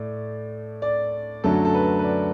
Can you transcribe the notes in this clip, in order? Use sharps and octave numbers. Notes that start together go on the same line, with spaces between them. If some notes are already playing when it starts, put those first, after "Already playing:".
Already playing: A2 A3 D5
D5
F#2 D3 F#3 A3 A4
A4
B4
B4
D5